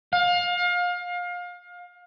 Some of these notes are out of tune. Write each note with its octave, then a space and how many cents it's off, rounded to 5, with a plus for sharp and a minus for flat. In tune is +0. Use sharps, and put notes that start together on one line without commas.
F5 +30